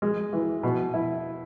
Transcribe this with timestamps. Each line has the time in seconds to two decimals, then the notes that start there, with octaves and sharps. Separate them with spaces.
0.02 G#3
0.33 E3
0.63 B2
0.94 E4